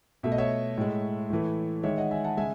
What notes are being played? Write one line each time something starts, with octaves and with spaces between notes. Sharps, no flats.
B2 A3 E5
D#5
C#5 E5
A2 G#3
A2 E3 A3
D#3 G#3 C#5 E5
D#5 F#5
E5 G#5
F#5 A5
C#3 G#3 E5 G#5